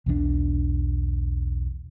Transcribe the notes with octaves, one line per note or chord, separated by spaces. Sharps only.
B1 E2 E3 D4